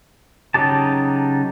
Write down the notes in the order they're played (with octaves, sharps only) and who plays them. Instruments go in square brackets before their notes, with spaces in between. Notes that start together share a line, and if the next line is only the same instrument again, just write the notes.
[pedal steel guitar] C#3 F#3 D#4 G4 A5